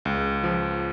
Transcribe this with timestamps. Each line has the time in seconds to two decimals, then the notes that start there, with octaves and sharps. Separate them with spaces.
0.05 C#2
0.44 F3